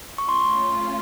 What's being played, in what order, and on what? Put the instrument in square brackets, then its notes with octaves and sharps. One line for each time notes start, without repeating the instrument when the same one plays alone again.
[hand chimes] C#6
[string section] A3 C#4 F4 [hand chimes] C6